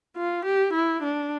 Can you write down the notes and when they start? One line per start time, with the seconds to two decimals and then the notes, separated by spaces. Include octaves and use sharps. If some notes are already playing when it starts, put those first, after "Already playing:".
0.17 F4
0.46 G4
0.74 E4
1.03 D4